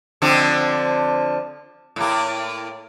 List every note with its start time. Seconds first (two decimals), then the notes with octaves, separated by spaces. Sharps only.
0.22 D3 F3 C4
1.96 A2 A#3